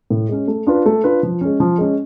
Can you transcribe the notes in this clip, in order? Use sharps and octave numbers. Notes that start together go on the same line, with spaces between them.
A2
G#3 C#4
A3
D4 F4 B4
A3
D4 F4 B4
F3
G#3 C#4
F3
G#3 C#4